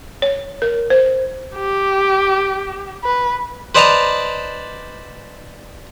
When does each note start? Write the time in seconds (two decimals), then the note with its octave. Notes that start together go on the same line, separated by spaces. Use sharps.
0.22 C#5
0.62 A#4
0.90 C5
1.55 G4
3.04 B4
3.75 B4 C5 D5 D#5 A5 A#5